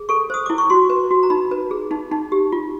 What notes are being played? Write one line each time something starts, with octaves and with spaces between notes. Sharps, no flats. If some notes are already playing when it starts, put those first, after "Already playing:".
Already playing: G#4
A4 C#6
C5 D#6
E4 D6
C#6
F#4 C6
B4
F#4
A#5
D#4 B5
B4
G#4
D#4
D#4
G4
F4